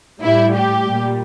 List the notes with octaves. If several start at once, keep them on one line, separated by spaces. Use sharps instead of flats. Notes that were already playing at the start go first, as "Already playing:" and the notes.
A2 G3 E4
G4
A#2 G3